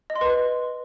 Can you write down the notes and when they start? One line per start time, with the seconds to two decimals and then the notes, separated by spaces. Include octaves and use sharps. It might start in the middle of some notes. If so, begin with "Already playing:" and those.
0.10 D#5
0.16 C6
0.21 B4